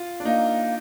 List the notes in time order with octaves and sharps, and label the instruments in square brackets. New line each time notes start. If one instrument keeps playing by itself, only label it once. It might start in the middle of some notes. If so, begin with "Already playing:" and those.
Already playing: [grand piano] F4
D4
[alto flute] A#3 [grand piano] D#4